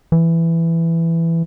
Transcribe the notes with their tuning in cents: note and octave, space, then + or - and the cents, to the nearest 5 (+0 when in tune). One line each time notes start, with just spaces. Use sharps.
E3 +10